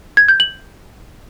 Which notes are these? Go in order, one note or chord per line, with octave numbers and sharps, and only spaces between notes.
G#6
G6
F#7